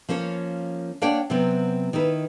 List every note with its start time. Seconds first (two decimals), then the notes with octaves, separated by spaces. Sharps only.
0.09 F3 A#3 C#4 C#5
1.01 A#3 D4 C#5 D5 F#5 G5
1.30 C3 F#3 B3 C4
1.93 D#3 D#4 E4 B4